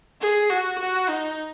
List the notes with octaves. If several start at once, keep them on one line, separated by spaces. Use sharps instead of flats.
G#4
F#4
F#4
D#4